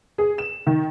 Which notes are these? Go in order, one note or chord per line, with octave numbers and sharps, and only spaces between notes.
G#4
E7
D#3